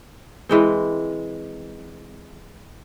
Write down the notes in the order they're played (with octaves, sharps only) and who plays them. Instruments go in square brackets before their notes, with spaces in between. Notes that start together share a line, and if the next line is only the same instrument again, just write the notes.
[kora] E3 G#3 C4